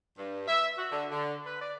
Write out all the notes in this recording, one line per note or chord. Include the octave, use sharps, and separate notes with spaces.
G2
E5
F#4
D3
D3
B4
D5